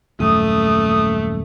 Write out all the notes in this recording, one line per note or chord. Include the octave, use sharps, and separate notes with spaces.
D#1 F#2 A3 D#6